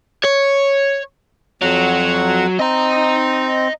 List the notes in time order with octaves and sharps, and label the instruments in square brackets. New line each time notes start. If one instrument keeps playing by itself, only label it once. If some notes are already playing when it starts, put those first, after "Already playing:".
[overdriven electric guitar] C#5
[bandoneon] F2 F#5 [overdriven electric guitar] F#3
[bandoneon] C4 [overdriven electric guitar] D#5 A#5